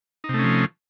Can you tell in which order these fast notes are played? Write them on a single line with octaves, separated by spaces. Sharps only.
D#4 C3 A3 C#4 F3